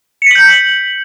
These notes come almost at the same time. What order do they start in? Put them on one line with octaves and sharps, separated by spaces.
C#7 B6 F#7 G6